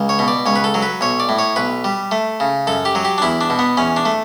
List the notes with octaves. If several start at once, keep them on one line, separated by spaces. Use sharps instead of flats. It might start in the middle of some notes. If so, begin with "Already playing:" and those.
Already playing: C#2
C#5
B2
D5
C#2 C#5
B4
A4
F#3
B4
B1 C#5
D5
A2
C#5
B1 B4
G3
A3
C#3
F#2 A4
G4
F#3
G4
D4
E2 E4
D4
B2
B3
E2 C#4
D4
A3